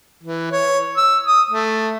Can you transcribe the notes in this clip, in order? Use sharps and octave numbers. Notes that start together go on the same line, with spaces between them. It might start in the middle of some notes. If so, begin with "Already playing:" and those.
E3
C#5
E6
D#6
A3